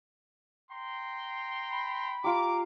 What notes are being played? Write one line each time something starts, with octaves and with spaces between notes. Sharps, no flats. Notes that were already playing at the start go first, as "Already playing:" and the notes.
G5 A#5 C6
B5
F4 G4 A#5 D6